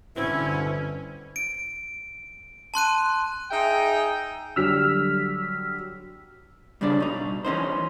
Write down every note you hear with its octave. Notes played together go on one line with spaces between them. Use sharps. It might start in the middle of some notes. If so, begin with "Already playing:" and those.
G1 B2 D3 E3 C4 C#4 E4
D7
A5 C6 F#6 D#7
D#4 G#4 E5 G5
D3 F#3 G3 E6 F6 B6
G2 C#3 D4 D5
B2 D#4
E3 C#4 D#4 C5